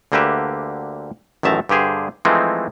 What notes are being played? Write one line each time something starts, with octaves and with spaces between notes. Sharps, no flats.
D2 D3 A#3 G4 B4 E5
A1 F#2 D#3 E5 A5 A#5
G2 D3 G4 G#4 C5
E3 F3 G#3 A3 C4 D#4